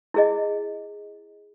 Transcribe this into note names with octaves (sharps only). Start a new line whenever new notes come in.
E4 G#4 D#5